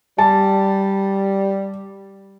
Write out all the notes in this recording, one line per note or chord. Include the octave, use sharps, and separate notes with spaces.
G3 A5